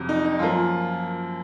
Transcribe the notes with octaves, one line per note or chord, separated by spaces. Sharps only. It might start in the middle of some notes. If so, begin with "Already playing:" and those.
Already playing: F2 C3 F#3
D#4
D#4
F#2 F3 A#3 F4